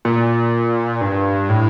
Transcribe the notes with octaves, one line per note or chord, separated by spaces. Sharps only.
A#2
G2
A2